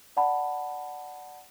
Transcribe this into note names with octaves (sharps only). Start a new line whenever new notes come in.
D5 F#5 A5 B5